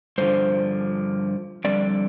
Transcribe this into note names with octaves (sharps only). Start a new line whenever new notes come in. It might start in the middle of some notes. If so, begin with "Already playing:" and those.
G2 D3 F3 C5
F2 D3 G3 D5